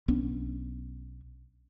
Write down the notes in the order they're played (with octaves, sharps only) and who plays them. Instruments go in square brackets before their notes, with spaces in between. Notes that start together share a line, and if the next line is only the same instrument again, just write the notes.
[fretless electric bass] B1 B3 C#4 D4